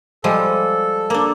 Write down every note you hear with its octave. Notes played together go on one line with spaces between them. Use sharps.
F3 G3 G#3 A4
A#3 D4